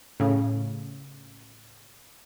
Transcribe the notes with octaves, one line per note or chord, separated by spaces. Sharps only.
A2 C#3